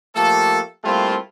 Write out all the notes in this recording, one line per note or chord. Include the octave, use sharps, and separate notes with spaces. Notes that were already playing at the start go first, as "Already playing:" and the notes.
F3 A3 A#3 G4 A4
G3 A3 A#3 C4 E4 F4